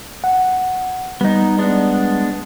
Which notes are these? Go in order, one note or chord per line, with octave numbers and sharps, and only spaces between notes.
F#5
G3 B3 D#4
G#3 B3 D4